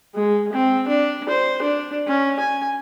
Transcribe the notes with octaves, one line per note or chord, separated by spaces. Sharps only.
G#3
C4
D4
C5
D4
C#4
G#5